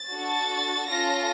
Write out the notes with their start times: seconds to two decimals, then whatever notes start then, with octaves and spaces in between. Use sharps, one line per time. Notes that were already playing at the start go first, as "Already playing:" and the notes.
Already playing: A6
0.12 D4 F#4 A4
0.88 C#4 F4 A4 A#6